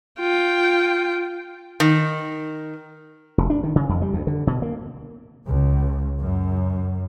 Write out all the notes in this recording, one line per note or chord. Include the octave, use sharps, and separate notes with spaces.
F4 G5
D#3
F1
D4
D#3
C#3
F2
G3
D2
D3
B2
A#3
C#2
F#2